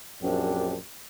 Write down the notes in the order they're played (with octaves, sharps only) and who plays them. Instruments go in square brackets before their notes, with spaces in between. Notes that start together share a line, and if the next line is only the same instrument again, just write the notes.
[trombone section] A#1 F#2 C4 D4 G4